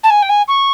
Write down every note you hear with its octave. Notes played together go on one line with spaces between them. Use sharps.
A5
G#5
G5
G#5
C#6